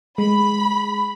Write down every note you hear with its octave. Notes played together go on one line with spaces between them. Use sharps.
G#3 B5